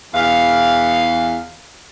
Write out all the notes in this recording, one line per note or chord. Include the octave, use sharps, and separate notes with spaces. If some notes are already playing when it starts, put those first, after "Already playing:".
E2 F5